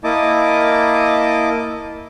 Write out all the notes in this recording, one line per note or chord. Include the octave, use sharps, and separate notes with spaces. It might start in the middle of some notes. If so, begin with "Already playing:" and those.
A#3 E4 D#5 A5 D6